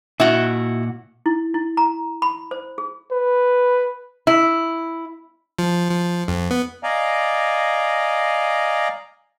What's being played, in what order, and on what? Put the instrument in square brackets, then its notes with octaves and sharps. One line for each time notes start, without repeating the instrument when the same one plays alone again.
[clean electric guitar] A#2 F#5 [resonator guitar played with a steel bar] E4 F#4
[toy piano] E4
E4
A#5
B5
C5
G#4
[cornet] B4
[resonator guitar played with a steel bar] E4
[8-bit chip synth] F3
F3
F2
B3
[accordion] D5 D#5 F5 G#5 A#5